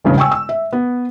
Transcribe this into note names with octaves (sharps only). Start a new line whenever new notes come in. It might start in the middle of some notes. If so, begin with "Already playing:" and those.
E1 A1 G2 C#3
G5 G#5 C#6 E6
E6
E5
B3